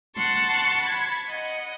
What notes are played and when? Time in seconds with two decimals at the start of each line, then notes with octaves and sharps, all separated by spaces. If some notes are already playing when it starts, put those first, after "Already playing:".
0.16 F#5 A5 C6 C#6
0.81 B5 G#6
1.29 D#5 F#5